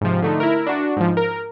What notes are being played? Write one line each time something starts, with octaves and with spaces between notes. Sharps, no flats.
G#2 C3 F3
D3 A3 D#4
E4 A#4
D4 F#4
G#2 F3
A#4